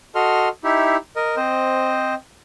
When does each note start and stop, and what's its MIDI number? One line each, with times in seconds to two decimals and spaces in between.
0.15 0.48 66
0.15 0.48 69
0.15 0.48 75
0.15 0.48 84
0.15 0.48 89
0.64 0.97 63
0.64 0.97 64
0.64 0.97 67
0.64 0.97 76
1.16 1.36 70
1.16 1.36 75
1.37 2.14 60
1.37 2.14 72
1.37 2.14 75